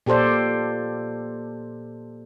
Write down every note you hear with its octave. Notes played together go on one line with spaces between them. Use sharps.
A#2 G4 A4 C5 D5